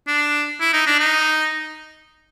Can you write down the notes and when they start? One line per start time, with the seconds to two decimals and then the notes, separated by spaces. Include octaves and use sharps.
0.07 D4
0.61 E4
0.73 D#4
0.86 D4
0.99 D#4